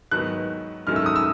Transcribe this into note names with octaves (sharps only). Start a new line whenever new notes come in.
G#2 D#3 F#3 B3 F#6
G#2 D#3 F#3 A3 C#4 F6
E6
D#6
E6